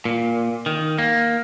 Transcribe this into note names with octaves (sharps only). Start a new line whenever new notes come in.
A#2
D#3
A#3